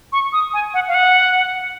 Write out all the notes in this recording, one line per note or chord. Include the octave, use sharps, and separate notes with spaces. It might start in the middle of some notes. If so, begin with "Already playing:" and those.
C#6
D#6
G#5
F#5
F5
F#5